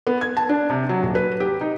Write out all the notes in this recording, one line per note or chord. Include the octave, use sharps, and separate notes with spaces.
B3
G#6
A5
D4
C3
F#3
D#1
B4
G4
D#4